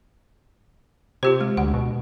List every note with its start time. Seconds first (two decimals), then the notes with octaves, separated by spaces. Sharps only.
1.23 C3 F4 G4 C5
1.41 G#3
1.57 D2 F#5
1.74 B2